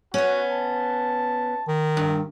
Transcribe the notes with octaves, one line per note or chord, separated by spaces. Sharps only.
B3 C#4 F#4
A5
D#3
G2